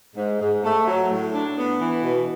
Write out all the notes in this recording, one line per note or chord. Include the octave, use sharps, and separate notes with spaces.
G#2
G#2
A3
F#3
A2
D4
B3
E3
B2